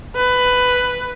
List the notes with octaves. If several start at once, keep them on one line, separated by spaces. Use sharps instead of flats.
B4